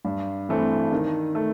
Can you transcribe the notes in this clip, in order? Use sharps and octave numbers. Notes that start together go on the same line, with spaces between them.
G2
E3 A3 C4
D#3
A3